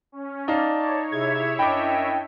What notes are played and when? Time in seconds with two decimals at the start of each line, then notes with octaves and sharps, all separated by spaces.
0.12 C#4
0.48 D#4 D5 F5 A5
0.79 C#5
1.12 C3 E4 G#4 C#5 E5 G#6
1.59 F#2 D4 D#5 G5 B5 D6